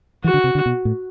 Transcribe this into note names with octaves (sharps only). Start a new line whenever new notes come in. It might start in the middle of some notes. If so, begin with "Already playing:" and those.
E3 F#4
D3
C3
D3
B2
A2